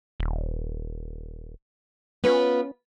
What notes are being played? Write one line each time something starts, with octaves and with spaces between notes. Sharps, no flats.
D#1
B3 C#4 F4 B4